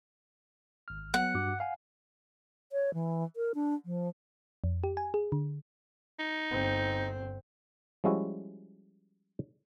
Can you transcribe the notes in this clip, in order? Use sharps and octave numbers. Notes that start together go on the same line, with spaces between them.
G#1 F6
F#3 B3 F#5
G2 F#4 D6
F5 F#5 G#5
C#5
E3
A#4
D4
F3
F2
G4
G#5
G#4
D3
D#4
G1 C4
F3 G3 G#3 C#4 E4 F#4